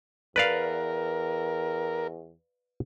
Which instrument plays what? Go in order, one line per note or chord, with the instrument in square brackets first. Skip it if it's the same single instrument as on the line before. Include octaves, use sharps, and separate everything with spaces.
[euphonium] E2 [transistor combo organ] A#4 [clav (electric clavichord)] B4 D5 F5